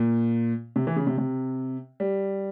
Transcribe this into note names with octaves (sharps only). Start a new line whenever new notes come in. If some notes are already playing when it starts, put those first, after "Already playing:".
Already playing: A#2
C3
E3
C#3
C3
C3
G3